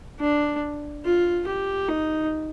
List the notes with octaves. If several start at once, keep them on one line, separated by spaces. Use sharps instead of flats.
D4
F4
G4
D#4